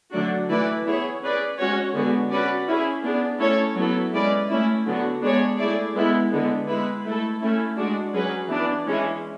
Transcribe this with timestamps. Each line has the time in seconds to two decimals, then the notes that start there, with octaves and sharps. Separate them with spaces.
0.12 D3 F#3 A3 D4 F#4
0.48 E3 A3 E4 B4 D5
0.86 B3 E4 G#4 C#5
1.22 C#4 G#4 B4 D5
1.58 G#3 C#4 F#4 C#5
1.94 D3 G#3 B3 F#4
2.31 C#4 F#4 B4 D5
2.67 C#4 E4 G#4
3.03 B3 D4 G#4
3.39 A3 C#4 E4 A4 C#5
3.76 F#3 B3 E4 A4
4.13 G#3 C#4 E4 B4 D5
4.50 A3 C#4 E4
4.85 D3 F#3 B3 F#4
5.22 G#3 B3 D4 G#4 C#5
5.58 A3 E4 G#4 D5
5.94 G#3 B3 E4
6.32 D3 G#3 B3
6.67 G#3 B3 E4 B4
7.04 A3 E4 A4
7.41 A3 C#4 E4
7.77 G#3 D4 F#4
8.14 F#3 C#4 G#4 B4
8.49 E3 B3 D4
8.86 E3 G#3 C#4 E4 G#4